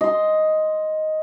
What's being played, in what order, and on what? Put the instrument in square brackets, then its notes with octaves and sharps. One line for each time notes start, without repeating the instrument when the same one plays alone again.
[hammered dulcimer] D#5 C6